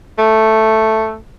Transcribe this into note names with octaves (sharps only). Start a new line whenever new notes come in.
A3